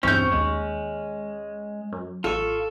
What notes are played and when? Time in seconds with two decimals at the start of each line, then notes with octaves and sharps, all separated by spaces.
0.03 B1 E2 G2 C4 C#4 G6
0.32 D#2 G#3
1.92 F#2
2.24 A1 F4 A4 C#6